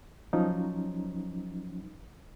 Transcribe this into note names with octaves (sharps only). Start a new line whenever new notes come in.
F3 F#3 C#4 D#4